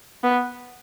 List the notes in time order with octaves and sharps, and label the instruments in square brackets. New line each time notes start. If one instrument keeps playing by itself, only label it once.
[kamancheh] B3